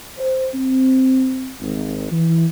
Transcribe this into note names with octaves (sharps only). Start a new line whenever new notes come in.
C5
C4
G#1
E3